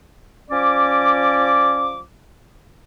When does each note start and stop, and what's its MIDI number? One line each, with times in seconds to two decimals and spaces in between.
0.51 1.99 53
0.51 1.99 61
0.51 1.99 74
0.51 1.99 86